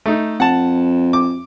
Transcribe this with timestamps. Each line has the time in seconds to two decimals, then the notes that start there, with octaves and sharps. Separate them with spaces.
0.06 A3 D#4
0.40 F2 F#5 A5
1.13 D6